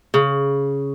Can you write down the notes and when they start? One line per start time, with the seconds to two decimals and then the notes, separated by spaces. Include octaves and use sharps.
0.14 C#3